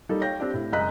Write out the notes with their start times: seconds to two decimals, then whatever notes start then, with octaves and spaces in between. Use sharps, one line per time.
0.09 G3 A#3 D#4 A4
0.21 C#5 F5 G5 G6 A#6
0.40 C4 D4 G4
0.54 A2
0.73 F#1 G#3 D#5 A#5 F#6 B6